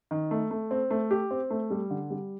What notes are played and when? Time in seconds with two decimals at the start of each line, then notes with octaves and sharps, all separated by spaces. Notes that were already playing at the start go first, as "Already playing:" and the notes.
0.11 D#3
0.31 A3
0.51 A3
0.71 C4
0.91 A3
1.11 G4
1.31 C4
1.50 A3
1.71 G3
1.90 D3
2.10 G3